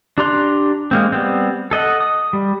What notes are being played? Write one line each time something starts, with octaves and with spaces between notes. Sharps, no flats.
D4 G4 A#5 C6 F#6
G#3 A#3 C4
G3 B3 C4
A4 D#5 F#5
D#6
G3